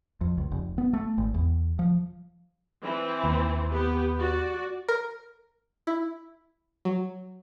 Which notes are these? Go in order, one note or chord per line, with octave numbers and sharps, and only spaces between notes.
F2
C#2
F1
B3
A3
G#1
E2
F3
E3 C4
D#2
B3 G4
F#4 D5
A#4
E4
F#3